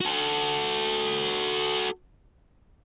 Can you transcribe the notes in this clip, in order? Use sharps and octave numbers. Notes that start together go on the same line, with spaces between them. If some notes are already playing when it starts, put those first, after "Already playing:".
F#4 A4